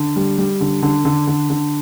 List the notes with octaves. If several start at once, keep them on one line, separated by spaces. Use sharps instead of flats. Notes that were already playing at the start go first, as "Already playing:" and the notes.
Already playing: D3
G3
G3
D3
D3
D3
D3
D3